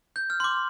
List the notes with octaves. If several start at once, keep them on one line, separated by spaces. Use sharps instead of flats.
G6
F6
C6
D6